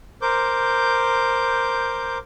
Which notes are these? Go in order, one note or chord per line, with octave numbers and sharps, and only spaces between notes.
A#4 C5 D6 G6